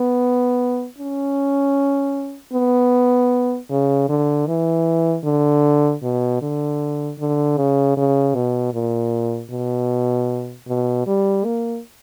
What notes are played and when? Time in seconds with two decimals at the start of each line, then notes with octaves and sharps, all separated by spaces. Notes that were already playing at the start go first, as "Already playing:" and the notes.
Already playing: B3
0.98 C#4
2.53 B3
3.70 C#3
4.09 D3
4.47 E3
5.24 D3
6.03 B2
6.42 D3
7.19 D3
7.57 C#3
7.97 C#3
8.34 B2
8.73 A#2
9.51 B2
10.68 B2
11.07 G3
11.45 A#3